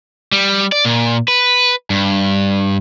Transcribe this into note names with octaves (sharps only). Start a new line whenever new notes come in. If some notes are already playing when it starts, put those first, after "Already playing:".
G3
D5
A#2
B4
G2